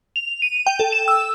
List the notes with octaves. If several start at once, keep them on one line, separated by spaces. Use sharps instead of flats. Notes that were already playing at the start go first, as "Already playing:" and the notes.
F7
D#7
G5
A4
E7
E6